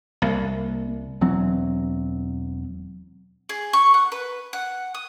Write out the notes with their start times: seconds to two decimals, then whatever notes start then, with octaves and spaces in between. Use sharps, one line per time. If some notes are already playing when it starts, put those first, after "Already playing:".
0.22 C2 A#3
1.21 E1 E3 F#3 C4
3.49 G#4
3.73 C#6
3.94 F#5
4.12 B4
4.53 F#5
4.94 D#6